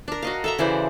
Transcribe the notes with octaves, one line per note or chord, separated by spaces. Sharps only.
D4 A#4
F#4 D#5 F5
A4 E5 A#5
C#3 E3 C5 D5